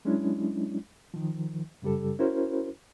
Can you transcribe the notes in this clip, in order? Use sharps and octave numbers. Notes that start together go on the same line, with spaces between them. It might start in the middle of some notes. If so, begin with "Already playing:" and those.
F#3 G#3 C#4 D4 E4
D#3 F3
F#2 C#3 G3 G4 A4
C#4 E4 F#4 A#4 C5